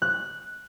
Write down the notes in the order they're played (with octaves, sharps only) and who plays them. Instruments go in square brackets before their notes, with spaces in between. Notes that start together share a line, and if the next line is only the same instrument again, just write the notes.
[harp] F#6